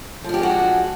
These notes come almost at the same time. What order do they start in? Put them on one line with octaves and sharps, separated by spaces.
F3 D4 G4 G#3 F#4